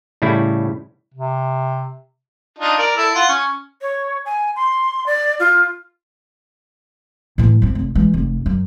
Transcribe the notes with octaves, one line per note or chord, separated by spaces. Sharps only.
A2 C#3 G3 E4
C3
D4 D#4 F4
A#4 D5
E4 A4
F4 F#5
C#4
C#5
G#5
C6
D5
F4
A2 E3
F3 C4
F1
E3 G#3
F1
F#2